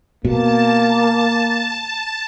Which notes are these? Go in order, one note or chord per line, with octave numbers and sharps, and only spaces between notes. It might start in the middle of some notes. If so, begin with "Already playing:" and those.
B2 A#3 A5